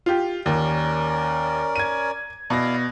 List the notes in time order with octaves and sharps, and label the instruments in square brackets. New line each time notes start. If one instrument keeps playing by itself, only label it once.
[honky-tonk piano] F4 G4
[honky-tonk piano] D#2 [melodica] C#4 A#4 D5
[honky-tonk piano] G#6 D#7
[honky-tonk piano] B2 A#6 [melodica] E4 D5 F5